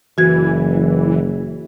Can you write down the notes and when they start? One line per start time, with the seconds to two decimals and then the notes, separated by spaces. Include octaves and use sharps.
0.18 F#1 E3 F#4 G#6